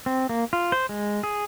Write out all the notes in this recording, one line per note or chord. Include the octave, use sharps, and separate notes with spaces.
C4
A#3
F4
C5
G#3
G#4